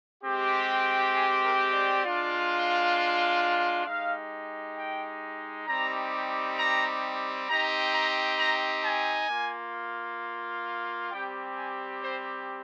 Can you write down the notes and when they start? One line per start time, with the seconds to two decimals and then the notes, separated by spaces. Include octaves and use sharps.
0.23 G#3 C4 G4
1.14 G#4
1.45 A#4
1.74 D5
2.04 G#3 D4 F4
3.85 G#3 D#4 G4 F5
4.77 G5
5.67 G3 C4 D#4 G4 A#5
6.58 A#5
7.48 C4 D#4 G4 A#5
7.93 A#5
8.39 A#5
8.84 G#5
9.29 A#3 F4
11.11 G3 C4 G4 G5
11.56 G#5
12.02 C5